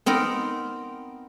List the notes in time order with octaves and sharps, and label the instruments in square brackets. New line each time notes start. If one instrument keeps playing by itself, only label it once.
[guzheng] B3 C4 D#4 A#4